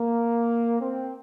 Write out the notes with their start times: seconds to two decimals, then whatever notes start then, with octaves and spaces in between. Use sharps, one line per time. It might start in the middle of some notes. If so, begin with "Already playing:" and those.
Already playing: A#3
0.80 C4